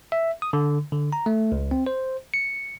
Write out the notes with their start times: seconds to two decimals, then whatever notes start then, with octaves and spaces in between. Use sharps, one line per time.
0.12 E5
0.42 D#6
0.53 D3
0.92 D3
1.13 A#5
1.26 A3
1.52 C#2
1.71 C4
1.87 C5
2.34 C#7